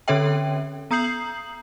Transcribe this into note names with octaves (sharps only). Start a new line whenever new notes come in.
D3 C#4 A4 C#5 E5 G5
B3 A#5 D#6 G6 C7 F#7